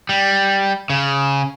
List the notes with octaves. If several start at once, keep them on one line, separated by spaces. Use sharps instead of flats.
G3
C#3